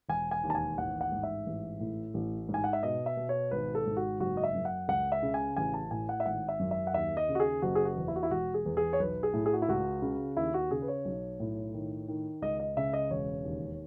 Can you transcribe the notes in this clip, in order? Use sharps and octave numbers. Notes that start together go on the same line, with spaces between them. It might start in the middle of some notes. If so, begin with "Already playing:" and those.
E1 G#5
G#5
D#2
A5
G#5
A1 F#5
F#5
G#2
E5
A1
A2
A1
G#2
G#5
F#5
E5
B2 D#5
E5
B2
C#5
G#1 B4
A4
G#2
F#4
F#1 F#4
D#5
E5
F#2
F#5
C#2 F#5
E5
C#3
G#5
A1 G#5
A5
A2 G#5
F#5
E5
G#1 F#5
E5
F#2
E5
F#5
D#2 E5
D#5
C#3
F#4
G#4
F#1 F#4
G#4
F#4
E2
E4
F#4
E4
E1 F#4
G#4
E2
G#4
C#5
B1 B4
G#4
A2
G#4
F#4
E4
C#2 F#4
C#3
D#2 E4
F#4
C#3 G#4
B4
C#5
B1
A2
D#3
D#3
C#2 D#5
D#5
C#3 E5
D#5
E1 C#5
D#2